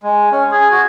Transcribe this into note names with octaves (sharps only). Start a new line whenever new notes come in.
G#3
C#4
G#4
F#4